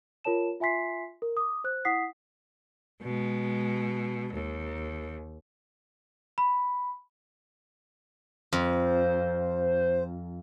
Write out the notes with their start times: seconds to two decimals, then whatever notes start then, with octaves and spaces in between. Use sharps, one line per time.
0.24 F4 A#4 C#5 A5 E7
0.60 F4 E5 G#5 C6 B6 C7
1.22 A#4
1.37 D6 D#6
1.64 C5 F#6
1.85 E4 F#5 D#6 B6 C7
3.02 B2 G#3
4.33 D#2
6.38 B5
8.53 F2 C5